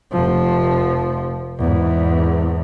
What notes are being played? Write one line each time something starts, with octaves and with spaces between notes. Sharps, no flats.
F1 F3
E2 G#2